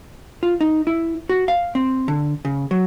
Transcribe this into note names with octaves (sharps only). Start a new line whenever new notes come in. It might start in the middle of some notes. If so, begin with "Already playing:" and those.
F4
D#4
E4
F#4
F5
C4
D3
C#3
F#3